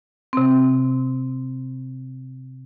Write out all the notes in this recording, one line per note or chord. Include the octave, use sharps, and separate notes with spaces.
C3 C4